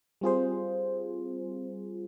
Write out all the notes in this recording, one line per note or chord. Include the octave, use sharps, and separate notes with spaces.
G3 C4 F4 G#4 C5